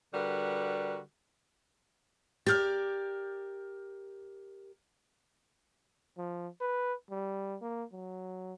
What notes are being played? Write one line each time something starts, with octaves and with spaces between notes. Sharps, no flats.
D3 G3 F#4 A#4 B4
G4 A#4 D5 F6 G6 A6
F3
B4
G3
A#3
F#3